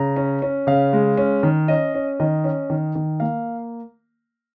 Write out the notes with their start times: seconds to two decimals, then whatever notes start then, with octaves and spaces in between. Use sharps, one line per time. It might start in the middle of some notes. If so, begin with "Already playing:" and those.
Already playing: C#3 A#5
0.16 C#4
0.42 C#4
0.67 C#3 F5
0.93 G#3
1.17 C#4
1.43 D#3
1.68 C#4 D#5
1.94 C#4
2.20 D#3 D#5
2.44 C#4
2.70 D#3
2.95 D#3
3.20 A#3 F5